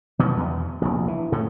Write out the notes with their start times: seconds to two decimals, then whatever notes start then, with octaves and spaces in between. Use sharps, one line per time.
0.19 B2 D#3 B3
0.37 E2
0.82 F1 A#1
1.08 E3
1.32 A2 C#3 A3